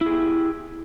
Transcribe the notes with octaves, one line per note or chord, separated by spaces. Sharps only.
E4 G4 G#4